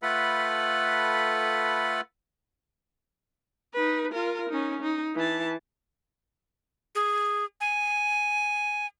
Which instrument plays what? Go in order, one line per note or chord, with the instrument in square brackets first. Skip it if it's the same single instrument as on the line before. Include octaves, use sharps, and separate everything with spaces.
[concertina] A3 F4 A4 B4 F#5 B5
[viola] D#4 B4
F4 A#4
C#4 D#4
D#4
E3 A5
[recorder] G#4
G#5